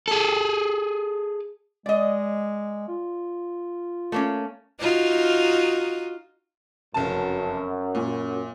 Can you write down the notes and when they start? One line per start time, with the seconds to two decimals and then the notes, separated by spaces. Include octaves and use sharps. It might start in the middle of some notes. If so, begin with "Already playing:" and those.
0.08 G#4 A4
1.86 G#3 D5 D#5
2.88 F4
4.12 A3 A#3 C#4
4.79 D#4 F4 F#4
6.94 F1 F#2 C#3 A5
7.95 A#2